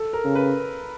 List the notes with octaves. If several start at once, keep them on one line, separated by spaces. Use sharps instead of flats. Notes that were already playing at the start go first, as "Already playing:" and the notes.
Already playing: A4
A#4
C#3
B4